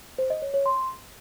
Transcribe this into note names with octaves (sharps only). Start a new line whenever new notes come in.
C5
D#5
C#5
C#5
C6